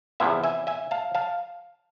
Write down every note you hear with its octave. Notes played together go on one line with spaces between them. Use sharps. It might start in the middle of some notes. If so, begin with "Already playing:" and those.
E2 C3 F3 B3 E5 G#5
E5 G#5
E5 G#5
F5 A5
F5 A5